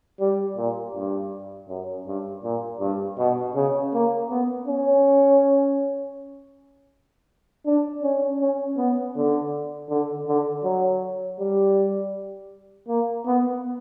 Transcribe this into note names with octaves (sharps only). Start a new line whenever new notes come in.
G3
A#2
G2
F#2
G2
A#2
G2
B2
C#3
A#3
B3
C#4
D4
C#4
C#4
B3
D3
D3
D3
F#3
G3
A#3
B3